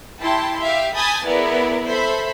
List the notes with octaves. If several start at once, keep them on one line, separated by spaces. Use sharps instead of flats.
E4 G4 G5 A5 C6
G4 E5 F5
G#5 A5 B5 D#6 G6 A6
B3 E4 G#4 A#4 D5
A4 C5 E5 B5